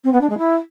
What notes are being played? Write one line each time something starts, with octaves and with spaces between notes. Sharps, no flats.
C4
B3
D4
G#3
E4